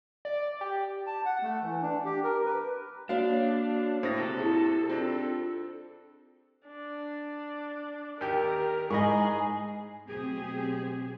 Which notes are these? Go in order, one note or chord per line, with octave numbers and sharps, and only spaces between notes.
D5
G4
A5
F#5
A3
E3
D4
G4
A#4
B4
A#3 D4 F#4 C#5 F5
A2 C5 A#6
C3 A4
E4 G4 G#4
C4 D4 F4
D4
D#2 G4 A#4
G#2 G#4 D#5 B5 C#6
B2 F#3 A3 C4 G4 G#4